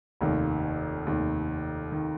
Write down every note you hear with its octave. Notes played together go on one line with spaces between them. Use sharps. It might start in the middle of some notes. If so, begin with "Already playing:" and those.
F1 D#2 D#3
F1 D#2 D#3
D#3